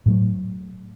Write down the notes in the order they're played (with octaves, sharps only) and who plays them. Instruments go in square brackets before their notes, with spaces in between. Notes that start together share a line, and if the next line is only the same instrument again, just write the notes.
[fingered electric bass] A2 F#3 A3